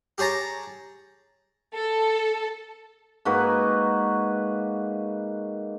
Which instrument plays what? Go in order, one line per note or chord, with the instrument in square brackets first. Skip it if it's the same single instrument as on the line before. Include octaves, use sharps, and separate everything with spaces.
[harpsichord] G4 G#4 C#5 A5 A#5
[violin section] A4
[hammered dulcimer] G#2 A#3 F#4 B4